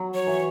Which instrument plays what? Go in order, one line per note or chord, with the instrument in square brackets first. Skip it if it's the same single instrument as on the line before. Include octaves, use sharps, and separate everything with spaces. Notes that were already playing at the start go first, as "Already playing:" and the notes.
Already playing: [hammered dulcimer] F#3
[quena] C#5
[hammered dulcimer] E3